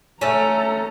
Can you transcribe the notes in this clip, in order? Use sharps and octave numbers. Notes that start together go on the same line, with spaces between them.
A3 C#4 A4 A#5